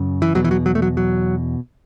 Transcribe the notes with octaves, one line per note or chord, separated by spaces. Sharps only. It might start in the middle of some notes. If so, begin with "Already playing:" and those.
Already playing: F#2 C#3
E3
E2 B2 F#3
E3
F#3
F#3
A3
F#3
F#3